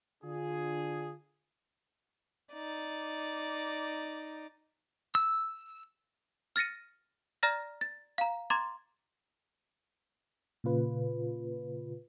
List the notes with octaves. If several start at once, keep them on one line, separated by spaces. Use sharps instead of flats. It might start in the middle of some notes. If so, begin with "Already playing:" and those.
D3 D4 F4 G#4
D#4 D5
E6
F6 A6 A#6 C#7 D#7
D5 A#5 F6 A6 A#6
A6
F5 A#5
A#5 C6 D6 G#6 A6
A#2 C#3 F4 B4